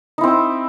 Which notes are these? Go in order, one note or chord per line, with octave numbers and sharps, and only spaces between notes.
C4 D#4 E4